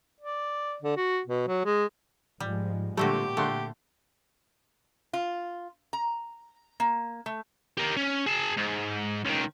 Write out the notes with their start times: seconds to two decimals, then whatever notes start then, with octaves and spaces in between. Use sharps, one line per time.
0.21 D5
0.82 D3
0.97 F#4
1.27 B2
1.48 F#3
1.65 G#3
2.40 G#2 F3 G3 G#3
2.97 A#2 D3 G3 A3 C4 F#4 G4
3.37 D3 A3 F#5 C6
5.13 F4
5.93 A#5
6.80 A#3
7.26 A3
7.77 G4 A#4
7.97 C#4
8.27 G#4 A5
8.57 G#2
9.25 C#2 D#3